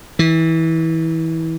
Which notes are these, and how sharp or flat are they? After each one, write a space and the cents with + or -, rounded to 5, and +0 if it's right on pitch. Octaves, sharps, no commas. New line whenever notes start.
E3 -25